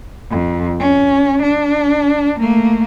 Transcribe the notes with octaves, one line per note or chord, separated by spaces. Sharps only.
F2
C#4
D4
A3 A#3